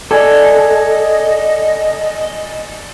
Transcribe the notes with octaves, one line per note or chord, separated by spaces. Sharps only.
A4 D5 D#5 G#5